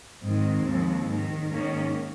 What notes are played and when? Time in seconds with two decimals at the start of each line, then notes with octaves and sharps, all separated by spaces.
0.21 G#2 D#3 G#3 C4
0.65 D#2 C#3 F3
1.08 G#2 D#3
1.51 G#2 D#3 A#3 C#4